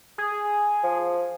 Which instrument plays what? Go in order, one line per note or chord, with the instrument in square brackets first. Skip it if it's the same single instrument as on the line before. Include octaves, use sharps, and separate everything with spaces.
[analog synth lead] G#4
[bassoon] F3